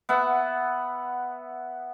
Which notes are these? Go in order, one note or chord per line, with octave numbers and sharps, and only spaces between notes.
B3 E5 F#5